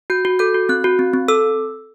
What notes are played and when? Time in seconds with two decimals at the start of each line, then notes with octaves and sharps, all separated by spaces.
0.10 F#4 G6
0.25 F#4
0.39 A4 G6
0.54 F#4
0.69 C4 F#6
0.84 F#4
0.99 C4
1.14 C4
1.28 A4 E6